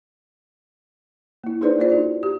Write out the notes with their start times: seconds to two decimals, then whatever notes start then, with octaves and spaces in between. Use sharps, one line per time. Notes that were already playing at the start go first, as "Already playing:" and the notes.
1.44 A#3 E4
1.61 D4 D#4 G#4 B4 C5 D5
1.78 A#3 F4 C5 D5
1.90 D#4 E4 F#4 C5 D5
2.23 G4